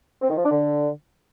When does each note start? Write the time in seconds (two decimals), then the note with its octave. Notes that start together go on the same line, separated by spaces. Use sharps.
0.22 C4
0.29 D#3
0.37 F3
0.44 D4
0.51 D3